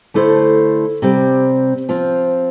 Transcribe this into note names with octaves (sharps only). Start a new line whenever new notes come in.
D3 A3 E4 A4 C5
C3 G3 C4
F3 C4 F4